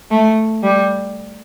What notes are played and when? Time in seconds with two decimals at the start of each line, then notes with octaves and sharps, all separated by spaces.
0.11 A3
0.63 G3